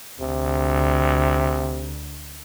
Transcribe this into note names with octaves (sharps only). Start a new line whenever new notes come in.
D2 C3